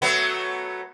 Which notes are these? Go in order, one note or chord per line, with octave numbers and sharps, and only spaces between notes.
F#3 A3 B3